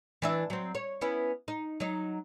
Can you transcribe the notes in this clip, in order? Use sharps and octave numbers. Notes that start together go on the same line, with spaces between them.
E3 D4 E5
F#3 C4
C#5
B3 C#4 E4
D#4
F#3 D#4